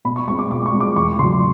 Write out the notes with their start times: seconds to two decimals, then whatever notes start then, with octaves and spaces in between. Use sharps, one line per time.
0.05 B2 B5
0.16 C#6
0.28 G#3 C#6
0.31 C4
0.39 D6
0.50 B2 D6
0.66 C#6
0.73 G#3 C4
0.80 D6
0.96 E2 C#6
1.19 C#3 C6
1.23 F#3